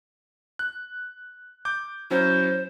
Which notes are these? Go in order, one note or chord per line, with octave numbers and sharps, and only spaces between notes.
F#6
D6 G6
F#3 C#4 E4 C5